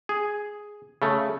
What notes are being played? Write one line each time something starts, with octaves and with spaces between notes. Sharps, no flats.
G#4
C#3 A3